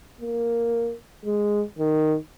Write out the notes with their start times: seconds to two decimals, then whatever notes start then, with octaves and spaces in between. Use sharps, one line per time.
0.21 A#3
1.25 G#3
1.79 D#3